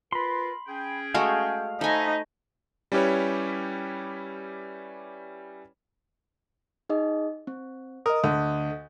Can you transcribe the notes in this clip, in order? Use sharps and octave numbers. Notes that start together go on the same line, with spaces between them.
F4 A#4 B4 B5 C6
C#4 G#4 G5
G#3 A3 F#4 F5
A3 D#4 C5 D#5 G#5 B5
G3 C#4 E4 G4 B4 C#5
D#4 G#4 D#5
C4
A#4 D#5 D#6
D2 D3